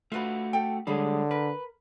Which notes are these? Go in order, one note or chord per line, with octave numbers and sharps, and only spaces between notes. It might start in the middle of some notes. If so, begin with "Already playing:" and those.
A3 F4 F#4 B4 B5
A4 G5
D3 G3 G#3 G#4 C#5 B5
A#4 B4